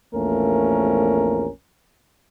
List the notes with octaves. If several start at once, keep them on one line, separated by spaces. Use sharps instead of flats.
A#1 E2 A3 A#3 C#4 A#4